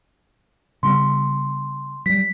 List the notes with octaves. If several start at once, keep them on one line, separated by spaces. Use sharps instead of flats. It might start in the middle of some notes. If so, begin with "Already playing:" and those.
C#3 G3 B3 C6
F#3 G3 B6